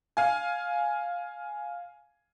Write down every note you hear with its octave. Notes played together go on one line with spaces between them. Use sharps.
F5 G#5